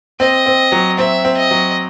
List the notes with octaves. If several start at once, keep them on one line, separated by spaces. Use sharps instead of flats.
C4 D#5
C4
F#3
C4 E5
C4
D#5
F#3